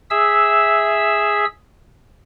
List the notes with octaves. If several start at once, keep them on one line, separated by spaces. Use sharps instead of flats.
G#4 E5 E6